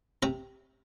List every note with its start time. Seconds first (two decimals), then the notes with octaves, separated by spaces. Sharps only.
0.23 C3 A#5